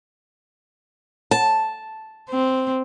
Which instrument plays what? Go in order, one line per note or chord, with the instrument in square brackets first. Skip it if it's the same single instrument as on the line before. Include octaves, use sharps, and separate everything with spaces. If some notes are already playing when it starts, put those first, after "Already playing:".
[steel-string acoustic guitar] A5
[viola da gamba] C4